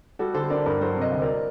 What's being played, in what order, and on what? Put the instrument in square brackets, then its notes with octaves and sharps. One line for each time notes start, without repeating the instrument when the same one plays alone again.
[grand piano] G3 [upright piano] F#4 A4
[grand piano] D3 [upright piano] A4 C5
[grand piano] D4 [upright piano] A#4 D5
[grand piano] G2 [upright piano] A#4 D5
[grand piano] F#3 [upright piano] A4 C5
[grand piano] C3 [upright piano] C5 D#5
[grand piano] D2
[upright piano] A#4 D5